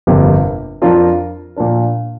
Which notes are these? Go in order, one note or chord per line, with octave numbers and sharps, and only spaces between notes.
G1 F2 C3 A#3
F2 F3 D4 F4 A#4
A#2 F3 D4 A#4